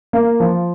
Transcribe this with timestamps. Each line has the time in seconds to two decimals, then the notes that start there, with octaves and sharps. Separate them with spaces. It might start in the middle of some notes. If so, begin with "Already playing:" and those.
0.13 A#3
0.40 F3